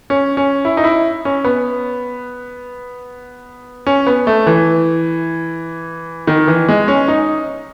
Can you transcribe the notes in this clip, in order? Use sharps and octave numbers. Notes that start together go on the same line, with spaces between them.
C#4
C#4
E4
D#4
E4
C#4
B3
C#4
B3
A3
E3
D#3
E3
G#3
C#4
D#4